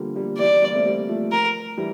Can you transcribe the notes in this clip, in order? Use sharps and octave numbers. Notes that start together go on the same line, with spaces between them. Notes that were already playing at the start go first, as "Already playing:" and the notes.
Already playing: D3 F3 G3 A#3
G3 A#3
E3 G3 D5
G3 A#3
A3 C4
G3 A#3
F3 A3
A#4
E3 G3